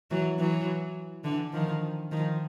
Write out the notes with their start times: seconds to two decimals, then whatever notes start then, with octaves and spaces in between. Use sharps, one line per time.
0.11 E3 F#3
0.39 E3 F#3
1.25 D3 E3
1.53 D#3 F3
2.12 D#3 F3